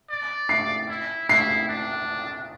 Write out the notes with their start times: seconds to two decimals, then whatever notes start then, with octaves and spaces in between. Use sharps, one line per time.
0.09 D5
0.49 C7
0.88 E4
1.29 E4 C7
1.69 D4